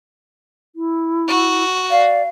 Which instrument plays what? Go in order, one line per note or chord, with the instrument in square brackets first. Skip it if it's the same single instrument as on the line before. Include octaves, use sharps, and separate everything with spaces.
[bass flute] E4
[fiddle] F#4
[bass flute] D5 [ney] F5